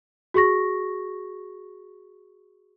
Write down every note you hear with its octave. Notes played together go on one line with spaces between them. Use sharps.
F#4 G#4 C#6 A#6